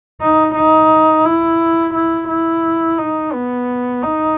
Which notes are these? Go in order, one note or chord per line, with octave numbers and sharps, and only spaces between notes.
D#4
D#4
E4
E4
E4
D#4
B3
D#4